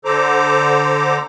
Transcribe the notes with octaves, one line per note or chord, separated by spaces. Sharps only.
D3 A4 C5 A#5 D6